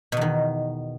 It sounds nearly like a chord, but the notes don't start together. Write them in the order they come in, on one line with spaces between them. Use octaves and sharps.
B2 E2 D#3